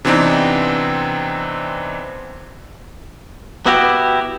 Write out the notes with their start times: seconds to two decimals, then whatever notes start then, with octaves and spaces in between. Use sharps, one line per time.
0.05 C3 E3 B3 C4 D4 D#4
3.66 B3 E4 F#4 G4